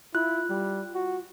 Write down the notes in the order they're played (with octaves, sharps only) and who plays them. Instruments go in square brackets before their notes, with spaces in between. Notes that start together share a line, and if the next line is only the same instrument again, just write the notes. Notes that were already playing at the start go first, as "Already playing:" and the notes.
[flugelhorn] E4 [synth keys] F4 [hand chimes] F#6
[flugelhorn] G3
F#4